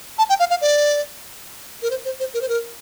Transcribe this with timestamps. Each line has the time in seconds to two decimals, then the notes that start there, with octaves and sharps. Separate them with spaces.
0.18 A5
0.29 G5
0.40 F5
0.50 F5
0.61 D5
1.82 A#4
1.91 C5
2.05 C5
2.20 C5
2.34 A#4
2.41 C5
2.49 A#4